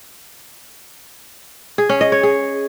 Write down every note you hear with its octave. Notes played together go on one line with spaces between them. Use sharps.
G#4
C#4
D#5
C#5
G#4